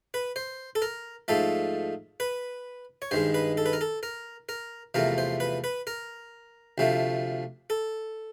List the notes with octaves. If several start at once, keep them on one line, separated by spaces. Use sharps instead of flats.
B4
C5
A4
A#4
G#2 F3 A3 A4
B4
C#5
G2 D#3 G#3 C5
B4
A4
B4
A#4
A4
A#4
A#4
E2 C3 F3 A3 A#4
C5
B4
B4
A#4
D2 C3 F3 A3
A4